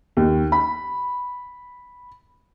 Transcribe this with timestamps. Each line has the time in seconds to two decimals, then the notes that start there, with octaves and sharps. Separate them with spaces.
0.17 D#2
0.52 B5